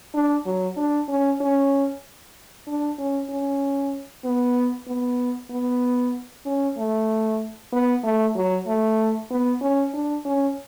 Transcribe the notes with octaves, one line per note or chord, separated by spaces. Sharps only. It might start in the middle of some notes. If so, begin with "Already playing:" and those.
D4
F#3
D4
C#4
C#4
D4
C#4
C#4
B3
B3
B3
C#4
A3
B3
A3
F#3
A3
B3
C#4
D4
C#4